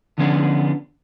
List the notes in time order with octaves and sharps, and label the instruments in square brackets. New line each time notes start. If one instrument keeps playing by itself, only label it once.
[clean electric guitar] D3 F3 B3 C#4 D4